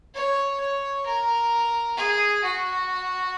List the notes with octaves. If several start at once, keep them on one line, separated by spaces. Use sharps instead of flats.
C#5
C#5
A#4
G#4
F#4